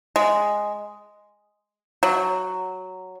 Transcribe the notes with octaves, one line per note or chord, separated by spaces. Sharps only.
G#3
F#3